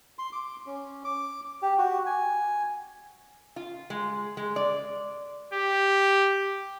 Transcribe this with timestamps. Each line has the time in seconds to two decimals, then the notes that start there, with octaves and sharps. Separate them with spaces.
0.19 C6
0.33 D6
0.66 C#4
1.05 D6
1.62 G4
1.78 F#4
2.06 G#5
3.56 F4
3.90 G#3
4.37 G#3
4.56 D5
5.54 G4